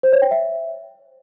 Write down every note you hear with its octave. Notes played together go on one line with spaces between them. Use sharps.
C5
C#5
G5
E5